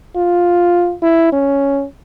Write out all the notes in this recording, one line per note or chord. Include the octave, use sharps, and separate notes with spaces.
F4
E4
C#4